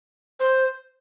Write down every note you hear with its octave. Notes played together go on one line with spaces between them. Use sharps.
C5